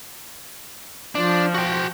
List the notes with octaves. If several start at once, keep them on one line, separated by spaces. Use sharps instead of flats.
F3 D4
F#4 G5